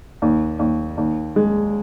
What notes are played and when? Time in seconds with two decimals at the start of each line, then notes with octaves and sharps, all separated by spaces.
0.22 D#2
0.59 D#2
0.98 D#2
1.36 G#3